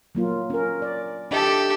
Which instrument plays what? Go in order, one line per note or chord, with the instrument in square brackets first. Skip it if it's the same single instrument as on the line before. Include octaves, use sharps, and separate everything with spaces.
[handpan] F#3 A#3 F4
C#4 A#4
D5
[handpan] D4 D#5 E5 [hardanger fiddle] G4 A4